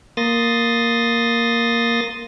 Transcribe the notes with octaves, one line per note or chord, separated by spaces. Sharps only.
A#3 C6 D#6 A6 A#6